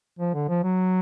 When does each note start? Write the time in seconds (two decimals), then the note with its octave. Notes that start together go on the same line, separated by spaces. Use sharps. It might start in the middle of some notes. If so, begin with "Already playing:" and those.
0.19 F3
0.34 D3
0.49 F3
0.64 F#3